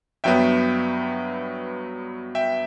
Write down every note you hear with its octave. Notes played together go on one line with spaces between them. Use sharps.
G2 F#3 B3 E5 G5
E5 G5